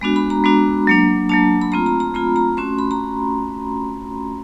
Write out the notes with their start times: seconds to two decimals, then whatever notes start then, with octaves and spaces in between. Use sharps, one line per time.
0.01 G#3 B3 D4 F#4
0.16 B5
0.30 A#5
0.44 G#3 B3 D4 F#4
0.87 F#3 A#3 D4
1.29 F#3 A#3 D4 A5
1.61 B5
1.72 A3 C4 F4 A#5
1.86 A#5
2.00 A#5
2.14 A3 C4 F4 B5
2.36 A#5
2.57 A3 C#4 F#4 C6
2.79 B5
2.91 A#5